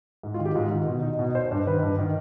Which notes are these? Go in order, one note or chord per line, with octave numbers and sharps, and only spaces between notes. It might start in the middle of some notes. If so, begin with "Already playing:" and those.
G#2
F4
D#3
G4
G#2 F4
D#3
B2
D#4
B2 D#4
C5
G2 C5
D#3 B4
G2
D#3